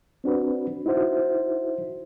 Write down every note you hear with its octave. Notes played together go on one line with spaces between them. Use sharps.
C4 D4 F#4 B4
D#4 E4 F#4 C5 E5